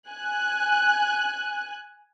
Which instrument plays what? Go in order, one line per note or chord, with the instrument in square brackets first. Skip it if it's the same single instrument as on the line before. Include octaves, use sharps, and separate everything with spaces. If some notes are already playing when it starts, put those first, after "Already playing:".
[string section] G#5 F#6